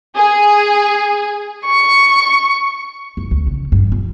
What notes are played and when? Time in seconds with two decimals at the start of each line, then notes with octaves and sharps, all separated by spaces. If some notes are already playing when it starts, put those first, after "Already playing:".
0.15 G#4
1.66 C#6
3.17 F#1
3.31 D2
3.47 C#3
3.72 G2
3.92 G1